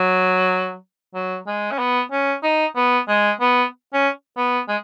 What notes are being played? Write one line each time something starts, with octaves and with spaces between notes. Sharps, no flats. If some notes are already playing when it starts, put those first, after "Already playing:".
Already playing: F#3
F#3
G#3
C#4
B3
C#4
D#4
B3
G#3
B3
C#4
B3
G#3